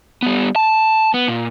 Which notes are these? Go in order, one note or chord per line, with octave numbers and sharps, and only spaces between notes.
G3 B3
A5
B3
A#2